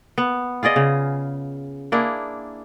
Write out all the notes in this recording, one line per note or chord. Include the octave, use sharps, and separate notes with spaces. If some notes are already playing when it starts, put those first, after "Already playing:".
B3
F4 G#4 D5 D#5
C#3
A#3 D4 E4 G#4